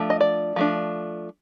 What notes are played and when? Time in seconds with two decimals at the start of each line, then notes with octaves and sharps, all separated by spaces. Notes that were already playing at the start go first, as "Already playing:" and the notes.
Already playing: F3 A3 D4
0.10 D#5
0.21 D5
0.56 F3 A3 D4